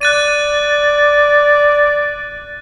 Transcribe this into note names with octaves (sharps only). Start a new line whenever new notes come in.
D5 F#6 A6 D#7